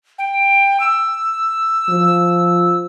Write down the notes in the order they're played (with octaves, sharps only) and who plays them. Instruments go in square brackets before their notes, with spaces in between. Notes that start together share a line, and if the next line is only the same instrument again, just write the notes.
[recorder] G5
E6
[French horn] F3